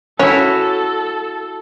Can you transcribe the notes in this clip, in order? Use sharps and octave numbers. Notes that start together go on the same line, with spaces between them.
C#4 E4 F#4 A4